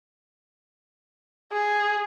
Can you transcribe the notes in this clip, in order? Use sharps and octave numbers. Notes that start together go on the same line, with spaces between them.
G#4